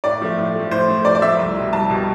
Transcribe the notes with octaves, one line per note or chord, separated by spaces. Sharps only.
A2 D5
F3 A3
A2
F3 A3
A2 C5
F3 A3
A2 D5
D5
F3 A3 E5
C2
B2 G3
C2 A5
B2 G3